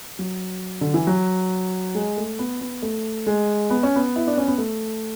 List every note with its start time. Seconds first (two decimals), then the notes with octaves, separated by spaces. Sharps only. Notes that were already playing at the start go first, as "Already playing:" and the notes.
0.19 F#3
0.81 D3
0.94 E3
1.07 F#3
1.95 G#3
2.17 A3
2.39 B3
2.61 B3
2.82 A3
3.27 G#3
3.70 B3
3.83 C#4
3.96 B3
4.16 E4
4.27 D4
4.37 C#4
4.48 B3
4.58 A3